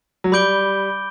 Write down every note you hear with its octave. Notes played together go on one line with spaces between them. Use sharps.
F#3
G3 B5 D6 G6 D7 G7